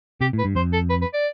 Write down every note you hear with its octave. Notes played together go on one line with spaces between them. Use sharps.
C3 G4
A2
B4
G2
F2 C5
A4
B4
B4
D5